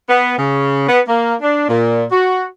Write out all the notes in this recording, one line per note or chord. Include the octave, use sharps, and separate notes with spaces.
B3
C#3
B3
A#3
D4
A#2
F#4